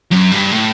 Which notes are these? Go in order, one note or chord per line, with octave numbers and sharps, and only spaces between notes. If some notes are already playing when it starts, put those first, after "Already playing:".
F#2
G2
A2